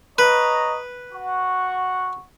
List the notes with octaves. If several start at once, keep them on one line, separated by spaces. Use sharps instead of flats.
B4 C#5 D#5 A#5
F#4 F#5 C#6